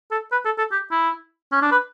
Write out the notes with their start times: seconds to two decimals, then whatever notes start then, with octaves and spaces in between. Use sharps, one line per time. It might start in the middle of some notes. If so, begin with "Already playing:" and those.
0.11 A4
0.32 B4
0.45 A4
0.58 A4
0.72 G4
0.91 E4
1.52 C#4
1.62 D4
1.72 B4